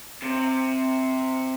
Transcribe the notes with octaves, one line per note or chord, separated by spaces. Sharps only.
C3